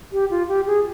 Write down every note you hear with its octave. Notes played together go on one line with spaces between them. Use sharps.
G4
F4
G4
G#4